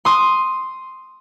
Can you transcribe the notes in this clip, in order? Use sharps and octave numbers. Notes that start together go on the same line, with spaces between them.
C6 D#6